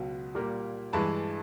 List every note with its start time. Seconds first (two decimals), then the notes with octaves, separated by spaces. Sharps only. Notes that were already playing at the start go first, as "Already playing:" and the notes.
Already playing: C#2 B2 F#3
0.35 A#2 G3 A#3
0.93 G2 E3 G#3 A5 B5